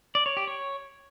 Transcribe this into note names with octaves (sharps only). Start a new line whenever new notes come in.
D5
C#5
G4
C#5